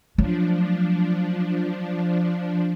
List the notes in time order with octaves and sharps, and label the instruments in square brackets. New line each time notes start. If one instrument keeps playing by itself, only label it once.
[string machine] F3 D4 [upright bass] F#3 A3